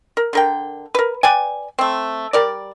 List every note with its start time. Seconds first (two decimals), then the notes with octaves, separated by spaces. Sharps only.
0.17 A#4
0.33 D3 A#4 G5
0.95 A#4 B4
1.23 B4 D5 G5 G#5
1.79 A3 C4
2.33 G3 A#4 D5